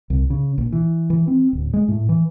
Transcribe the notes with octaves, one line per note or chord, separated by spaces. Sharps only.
C2
C#3
A#1
E3
E3
C4
D1
G#3
A2
E3